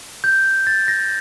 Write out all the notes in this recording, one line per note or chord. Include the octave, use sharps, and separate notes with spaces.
G6
A6
A#6